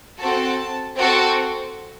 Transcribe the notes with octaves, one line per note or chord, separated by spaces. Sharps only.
C4 F#4 A4 A5
C4 F#4 A4